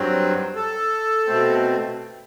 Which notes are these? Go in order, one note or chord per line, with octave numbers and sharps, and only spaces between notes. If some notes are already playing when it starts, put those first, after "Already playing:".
Already playing: G2 F#3 C4
A4
B2 A3 C4